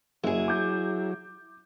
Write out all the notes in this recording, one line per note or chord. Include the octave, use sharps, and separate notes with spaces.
F#1 F#3 E4 G#4
D6 G6